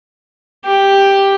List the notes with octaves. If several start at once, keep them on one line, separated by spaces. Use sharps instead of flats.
G4